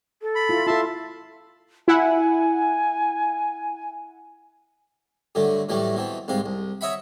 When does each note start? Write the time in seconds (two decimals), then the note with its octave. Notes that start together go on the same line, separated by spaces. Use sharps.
0.22 A4
0.35 B5
0.49 E4 F4
0.67 F4 A4 E5 A5 C6
1.88 E4 F#5 G#5
5.35 G2 D3 F#3 A3
5.69 A2 E3 F#3 G3 A3
5.95 B2 E3 C4
6.28 C2 G#2 C4 F5
6.46 C2
6.81 C#5 D#5 E5 F#5 B5